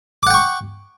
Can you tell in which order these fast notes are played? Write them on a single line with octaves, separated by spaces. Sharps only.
D6 F#5 G5 C#6